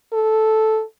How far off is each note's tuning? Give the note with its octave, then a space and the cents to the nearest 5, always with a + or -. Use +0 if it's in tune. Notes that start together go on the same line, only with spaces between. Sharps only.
A4 -5